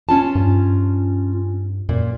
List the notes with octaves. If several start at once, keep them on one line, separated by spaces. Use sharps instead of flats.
C#4 F4 A5
G2
F#2 A#2